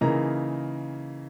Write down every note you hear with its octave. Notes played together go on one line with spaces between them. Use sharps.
C#3 E3 A#3 D#4 A#5